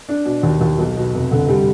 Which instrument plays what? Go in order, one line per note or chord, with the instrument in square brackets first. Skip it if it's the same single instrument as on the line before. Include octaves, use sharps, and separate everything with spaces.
[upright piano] D4
B2
D#2
D#2
B1
B2
F1
D3
G3